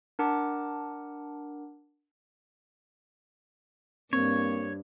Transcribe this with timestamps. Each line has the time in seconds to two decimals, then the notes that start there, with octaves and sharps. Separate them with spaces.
0.19 D4 A#4 F#5 A5 A#5 D6
4.13 G2 A#3 C4 C#5